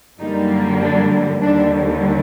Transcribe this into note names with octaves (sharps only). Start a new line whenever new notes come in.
F#2 D3 G3 A#3 D#4
D4
D#2 D3 G3 D4